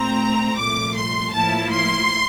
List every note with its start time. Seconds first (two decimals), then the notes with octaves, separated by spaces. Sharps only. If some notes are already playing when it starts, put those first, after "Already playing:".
Already playing: A#2 A3 C4 A#5
0.58 C2 A#2 F3 A3 D6
0.96 C6
1.34 A2 F3 A#3 E4 A5
1.72 C6